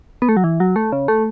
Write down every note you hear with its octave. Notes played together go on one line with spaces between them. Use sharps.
B3
A3
F#3
E3
F#3
A3
C#3
A3